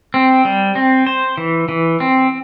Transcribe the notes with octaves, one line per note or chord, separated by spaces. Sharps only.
C4
G3
C4
C5
E3
E3
C4